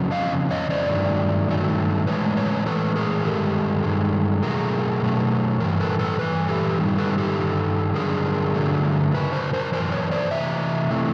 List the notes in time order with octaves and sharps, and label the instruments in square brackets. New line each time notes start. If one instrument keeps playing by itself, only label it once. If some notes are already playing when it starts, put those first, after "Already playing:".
Already playing: [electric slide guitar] F2 C#3 F#3
D#5 F5
F2 C#3
C#5 D#5
C5 D5
G2 D#3 F#3 A3
G2 D#3 F#3 A3
A2 E3 G#3 B4 C#5
B4 C#5
A2 E3 G#3 A4 B4
G#4 A#4
G2 D#3 G#3 G4 A4
G2 D#3 G#3
B2 F#3 A3 G#4 A#4
B2 F#3 A3
G2 E3 A#4
A4 B4
A4 B4
G2 E3 B4
G4 A4
G2 D#3 G3
A4 B4
G4 A4
G2 D#3 G3
G2 D3 F#3 G#4 A#4
G2 D3 F#3 A3
F#2 C#3 B4
A#4 C5
A#4 C5
C#3 E3 A#4 C5
F#2
B4 C#5
C5 D5
C3 E3 A3 E5
C3 E3 A3